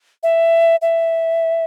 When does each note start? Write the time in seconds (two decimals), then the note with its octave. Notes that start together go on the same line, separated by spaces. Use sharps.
0.23 E5
0.82 E5